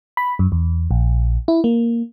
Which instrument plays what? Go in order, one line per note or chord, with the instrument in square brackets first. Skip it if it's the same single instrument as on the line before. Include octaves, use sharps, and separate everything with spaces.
[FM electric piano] B5
F#2
E2
A#1
E4
A#3